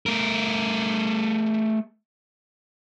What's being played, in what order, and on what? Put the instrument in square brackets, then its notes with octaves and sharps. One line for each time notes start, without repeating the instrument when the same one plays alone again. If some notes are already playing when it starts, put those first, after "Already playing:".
[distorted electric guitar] A3 A#4